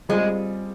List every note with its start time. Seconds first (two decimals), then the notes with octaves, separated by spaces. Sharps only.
0.09 G3 G#3 C4 F4 G#4